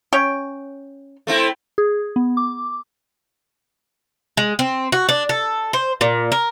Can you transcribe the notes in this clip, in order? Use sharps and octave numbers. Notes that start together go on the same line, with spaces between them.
C#4 C#5 G5
A3 C4 E4
G#4
B3
D6
G#3
C4
F#4
D4
A4
C5
A#2
A#4